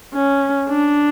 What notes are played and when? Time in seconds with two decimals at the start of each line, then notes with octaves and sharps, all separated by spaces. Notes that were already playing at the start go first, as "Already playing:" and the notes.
0.14 C#4
0.69 D4